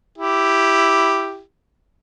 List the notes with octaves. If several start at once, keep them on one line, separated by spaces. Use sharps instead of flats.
E4 G4